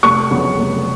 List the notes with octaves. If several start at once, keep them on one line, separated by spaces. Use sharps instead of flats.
F1 C#6
F2 C#3 F#3 B3
F1